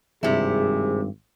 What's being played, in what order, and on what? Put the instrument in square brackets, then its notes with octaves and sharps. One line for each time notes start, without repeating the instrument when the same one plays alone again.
[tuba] G#1 [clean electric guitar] E2 G2 [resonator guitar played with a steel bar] C3 E4 [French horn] G#4